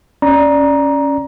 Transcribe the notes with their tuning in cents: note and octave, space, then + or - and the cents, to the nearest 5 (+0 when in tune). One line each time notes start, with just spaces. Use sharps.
C#4 +0 D5 +0 A#5 +15